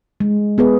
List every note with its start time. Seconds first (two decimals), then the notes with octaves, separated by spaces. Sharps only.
0.20 G#3
0.58 B3 G#4 B4